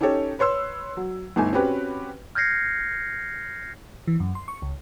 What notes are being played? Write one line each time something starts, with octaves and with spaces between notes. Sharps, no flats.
C#4 D#4 G4 A4 C#5
B4 C#5 C6 E6
F#3
G1 A3 D#4 G#5
C4 C#4 F#4 G4 B4
F6 G6 G#6 A#6 C7 C#7
E3
F#2
C6
C#6
C#2